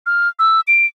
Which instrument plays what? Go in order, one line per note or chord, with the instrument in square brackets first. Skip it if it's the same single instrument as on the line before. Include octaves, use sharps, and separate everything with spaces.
[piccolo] F6
E6
D7